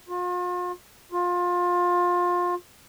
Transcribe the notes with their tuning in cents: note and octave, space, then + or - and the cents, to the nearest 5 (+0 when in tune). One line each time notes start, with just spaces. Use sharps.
F4 +40
F4 +25